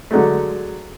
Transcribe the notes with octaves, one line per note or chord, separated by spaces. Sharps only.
D3 F#3 G#3 A3